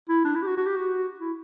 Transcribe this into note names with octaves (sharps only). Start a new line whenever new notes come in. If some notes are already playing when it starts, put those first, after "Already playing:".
E4
D4
E4
G4
F#4
F#4
G4
F#4
E4